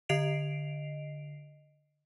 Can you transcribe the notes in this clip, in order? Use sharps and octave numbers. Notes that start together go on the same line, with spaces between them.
D3 D#5 C7 D7 F7